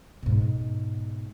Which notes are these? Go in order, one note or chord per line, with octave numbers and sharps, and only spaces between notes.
G#2 B2